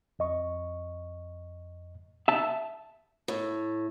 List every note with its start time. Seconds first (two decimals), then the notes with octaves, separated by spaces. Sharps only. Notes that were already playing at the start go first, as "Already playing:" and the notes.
0.19 F2 D#5 C#6
2.28 E5 A5
3.28 A2